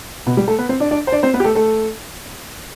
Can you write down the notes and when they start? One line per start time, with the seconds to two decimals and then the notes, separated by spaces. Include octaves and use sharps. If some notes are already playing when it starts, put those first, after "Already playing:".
0.26 B2 B3
0.37 G3 G4
0.48 A3 A4
0.59 B3 B4
0.69 C4 C5
0.80 D4 D5
0.91 D4 D5
1.07 C5
1.12 D4 D5
1.23 C4 C5
1.34 B3 B4
1.40 G4
1.44 A3 A4
1.55 A3 A4